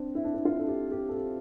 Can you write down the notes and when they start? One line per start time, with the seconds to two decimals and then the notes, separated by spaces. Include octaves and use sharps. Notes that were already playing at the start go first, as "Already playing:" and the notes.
Already playing: C4 D4
0.15 E4
0.24 D4
0.34 E4
0.45 F4
0.59 A4
0.68 G4
0.92 G4
1.09 A4
1.14 G4